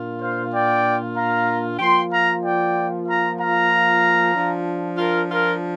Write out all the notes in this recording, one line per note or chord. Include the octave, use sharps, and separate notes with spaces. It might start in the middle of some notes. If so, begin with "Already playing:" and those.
Already playing: A#2 A#3 D4 F4
C5 F5
D5 G5
F5 A#5
F3 A#3 F4 G5 C6
F5 A#5
D5 G5
F5 A#5
F5 A#5
F3 D4 F4
F4 A#4
F4 A#4